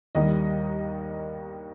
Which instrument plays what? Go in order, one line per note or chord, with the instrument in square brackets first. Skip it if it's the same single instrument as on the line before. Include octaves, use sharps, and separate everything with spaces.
[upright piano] D#2 D#3 G3 A#3 D#5